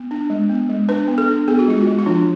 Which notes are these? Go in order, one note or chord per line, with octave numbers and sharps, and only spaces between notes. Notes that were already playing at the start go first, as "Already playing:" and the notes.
Already playing: B3
D4
G#3
B3
G#3
D4 B4
B3
A4
D4
B3 G#4
F#4
G#3 F4
F#4
G#3
F4
F3 D4